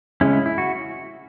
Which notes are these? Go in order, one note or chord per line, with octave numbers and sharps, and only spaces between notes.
C#3 G#3 C#4 E4
E4
E4
F#4